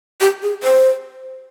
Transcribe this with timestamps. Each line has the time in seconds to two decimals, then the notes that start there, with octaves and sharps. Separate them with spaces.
0.21 G4
0.42 G#4
0.63 C5